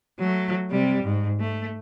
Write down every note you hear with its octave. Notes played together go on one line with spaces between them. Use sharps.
F#3 A3
C3 G3
G#2
A3